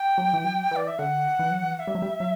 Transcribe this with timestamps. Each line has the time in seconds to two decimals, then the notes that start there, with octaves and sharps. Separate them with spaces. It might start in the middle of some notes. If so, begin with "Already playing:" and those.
Already playing: G5
0.18 F#3
0.34 E3
0.44 F#3
0.71 E3 D5
0.88 E5
0.99 D3 F#5
1.39 E3
1.51 F#3
1.62 E3
1.80 E5
1.87 G3
1.95 F#3
2.02 G3
2.20 F#3